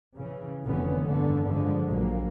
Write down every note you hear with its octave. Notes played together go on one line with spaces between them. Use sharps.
C#3 E3
F1 A#2 D3 E3 B3 C#4
G2 D3 D#3
D3 F3 G#3
A#1 A#2 F#3 A#3